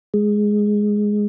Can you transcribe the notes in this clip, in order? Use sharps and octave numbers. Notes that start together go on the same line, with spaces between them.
G#3